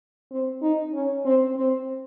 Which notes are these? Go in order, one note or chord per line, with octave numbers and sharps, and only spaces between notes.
C4
D#4
C#4
C4
C4